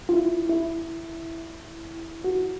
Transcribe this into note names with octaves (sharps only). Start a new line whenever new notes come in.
F4
E4
E4
F#4